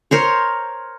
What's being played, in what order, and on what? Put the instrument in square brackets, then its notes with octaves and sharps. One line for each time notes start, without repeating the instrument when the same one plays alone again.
[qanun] A#4 C5 C#5